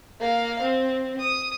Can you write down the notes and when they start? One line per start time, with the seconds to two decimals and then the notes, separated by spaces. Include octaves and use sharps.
0.20 A#3 F5
0.62 C4
1.20 D#6